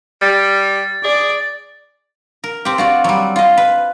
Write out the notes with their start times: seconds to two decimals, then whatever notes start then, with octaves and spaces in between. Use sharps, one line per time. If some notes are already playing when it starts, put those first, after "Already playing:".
0.22 G3 A6
1.04 G#4 D5
2.44 A#4
2.65 C4 G4
2.78 F4 F#4 D5
3.04 F#3 G3
3.36 F4 D#5
3.57 B4